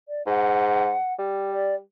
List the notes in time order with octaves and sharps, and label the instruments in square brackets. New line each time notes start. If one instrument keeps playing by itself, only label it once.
[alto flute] D5
[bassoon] G#2 [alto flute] F#5
[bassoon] G3
[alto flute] D5